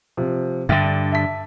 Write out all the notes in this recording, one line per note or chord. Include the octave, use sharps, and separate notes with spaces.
C3 F3
G2 D3 E5 G5 A6
E5 A5 B6